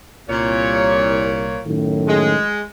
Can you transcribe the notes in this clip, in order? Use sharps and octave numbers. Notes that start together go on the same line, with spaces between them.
C2 A#2 C#5
F#2 A2 D#3
G#3